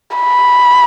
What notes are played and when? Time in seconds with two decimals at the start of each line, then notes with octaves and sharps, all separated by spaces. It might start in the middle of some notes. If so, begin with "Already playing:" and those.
0.17 B5